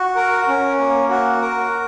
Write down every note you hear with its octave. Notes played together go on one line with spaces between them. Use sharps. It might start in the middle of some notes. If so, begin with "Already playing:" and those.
Already playing: F#4
A#4
C#4
A#3
F#4
A#4